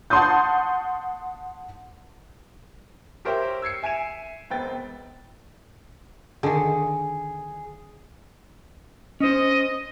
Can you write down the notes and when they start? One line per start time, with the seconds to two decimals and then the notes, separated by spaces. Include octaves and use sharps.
0.10 F#5 A5 C6 C#6 D#6 G6
3.25 G4 A#4 C5 C#5 E5 G5
3.62 E6 G#6 C7 C#7
3.82 E5 G#5 G#6 D7 E7
4.50 E1 B3 C4 G5 A6
6.43 D3 D#3 G#4
9.20 C#4 C5 D#5